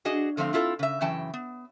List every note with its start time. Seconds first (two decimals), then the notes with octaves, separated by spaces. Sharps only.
0.05 D4 F#4 G#4 D#5
0.37 D3 F3 A3 C4 F5
0.53 C4 E4 F4 A4
0.79 C#3 E5
1.01 F#2 C#3 E3 G5 A5
1.34 B3